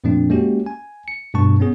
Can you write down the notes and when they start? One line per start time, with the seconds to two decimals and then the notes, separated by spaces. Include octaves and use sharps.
0.04 F2 A#2 F3 A3 C4 D4
0.30 G#3 A#3 C#4 F#4 G4
0.66 G#5
1.08 C#7
1.34 G2 B2 A3 A5 C#6
1.60 B3 C#4 G#4